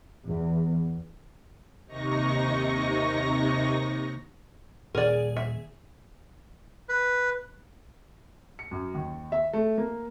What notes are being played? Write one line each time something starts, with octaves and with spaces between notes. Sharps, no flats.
E2
D#2 C3 D#4 C#6 A#6
D#1 G#4 A#4 D5
E5
B4
C#7
F#2
D#2
E5
A3
A#3